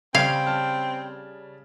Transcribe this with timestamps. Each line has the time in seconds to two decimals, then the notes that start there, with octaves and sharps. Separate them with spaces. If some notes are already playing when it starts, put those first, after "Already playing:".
0.15 C#3 G3 C4 F5 G#6
0.46 G3 A5 F6